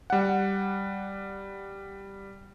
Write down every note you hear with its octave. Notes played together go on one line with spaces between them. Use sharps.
G3 F#5